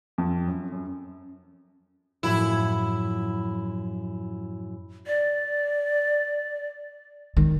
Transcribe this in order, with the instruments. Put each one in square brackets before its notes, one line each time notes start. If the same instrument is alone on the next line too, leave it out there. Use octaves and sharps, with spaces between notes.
[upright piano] F2
F#2
F#2
[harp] F#2 A2 F3 [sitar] E4
[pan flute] D5
[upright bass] D#3